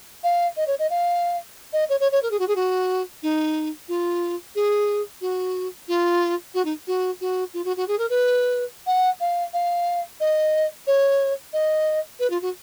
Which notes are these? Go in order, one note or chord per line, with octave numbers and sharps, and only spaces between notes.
F5
D#5
C#5
D#5
F5
D#5
C#5
C#5
C#5
A#4
G#4
F#4
G#4
F#4
D#4
F4
G#4
F#4
F4
F#4
D#4
F#4
F#4
F4
F#4
F#4
G#4
A#4
B4
F#5
F5
F5
D#5
C#5
D#5
B4
F4
F#4